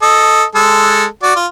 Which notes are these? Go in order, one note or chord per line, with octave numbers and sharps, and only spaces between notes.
A4 D#5
G#3 A4
F#4 D5
F4